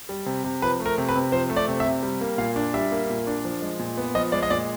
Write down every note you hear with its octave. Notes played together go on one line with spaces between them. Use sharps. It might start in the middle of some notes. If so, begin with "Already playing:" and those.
G3
C3
C3
F3 B4
A3
A#4
C3
B4
C3
F3 C5
A3
D5
C3
E5
C3
G3
A#3
A#2 F5
D4
G3 E5
A#3
A#2
D4
F3
G#3
A#2
B3
F3 D#5
G#3 D5
D#5
A#2 D5